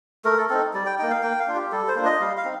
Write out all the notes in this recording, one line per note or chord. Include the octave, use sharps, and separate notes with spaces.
A3 A#4
A4
C4 D#4 A4
G3 D5
G5
A#3 D#4 G5
F5
A#3 G5
F5
D4 F4
G4
G3 A4
C5
A#3 D4 F4
D#5
G3 F5
F5
C4 D#4